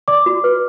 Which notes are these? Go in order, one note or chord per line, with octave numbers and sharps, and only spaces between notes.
D5 D6
F#4
B4